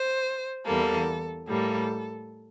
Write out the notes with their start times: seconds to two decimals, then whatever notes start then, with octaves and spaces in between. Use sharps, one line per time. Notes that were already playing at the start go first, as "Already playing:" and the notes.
Already playing: C5
0.67 E2 E3 G3 A#3 A4
1.49 A2 G3 A#3 A4